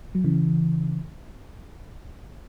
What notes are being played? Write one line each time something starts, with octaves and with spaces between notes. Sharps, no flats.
F#3
C#3 E3